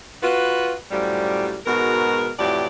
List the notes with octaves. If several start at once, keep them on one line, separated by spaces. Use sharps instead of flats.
F4 F#4 B4
F#2 A2 F3 G3
G#2 B2 G#3 F#4 A#4
F2 A2 E3 F#3 G4 D5